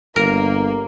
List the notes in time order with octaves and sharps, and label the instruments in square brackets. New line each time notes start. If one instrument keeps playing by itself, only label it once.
[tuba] G1 [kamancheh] A#3 [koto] A#4